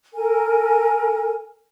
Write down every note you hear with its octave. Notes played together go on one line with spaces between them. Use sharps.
A4 A#4 G#5